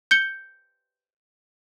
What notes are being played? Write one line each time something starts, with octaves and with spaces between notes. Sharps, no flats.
G6 C#7 G7